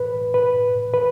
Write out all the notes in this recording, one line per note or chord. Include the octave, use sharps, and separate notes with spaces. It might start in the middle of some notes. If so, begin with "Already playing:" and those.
Already playing: B4
B4
B4